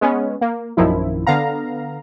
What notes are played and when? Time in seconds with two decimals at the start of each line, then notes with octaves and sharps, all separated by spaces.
0.01 G#3 B3 C#4
0.41 A#3
0.77 A#1 F#2 D#3 F3 E4
1.27 D3 B3 F5 A#5